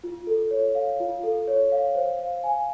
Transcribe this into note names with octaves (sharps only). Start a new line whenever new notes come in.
F4
A4
C#5
F5
F4
A4
C#5
F5
C5
F5
G#5